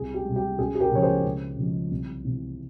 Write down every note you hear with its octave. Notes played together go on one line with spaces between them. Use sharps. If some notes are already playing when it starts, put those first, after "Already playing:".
Already playing: C2 G#4
G4
C3 G3
G4
C#2 G#4
G#4
G4 A#4
C#3 F3 C#5
G#4 C5
C#2
C#3 F3 G#3
C2
C3 E3